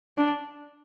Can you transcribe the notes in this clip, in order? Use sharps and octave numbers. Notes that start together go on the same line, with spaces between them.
D4